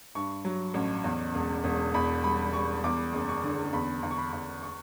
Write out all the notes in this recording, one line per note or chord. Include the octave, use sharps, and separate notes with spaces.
G2 C#6
F#3
A1
E2
E1
E1
E2 B5
G3 B5
G3 C#6
E2 D6
F#1
C#6
D3
E2 B5
E2
C#6
B5
E2
C#6